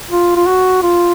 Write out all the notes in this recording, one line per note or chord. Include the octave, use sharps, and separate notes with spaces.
F4
F4
F#4
F4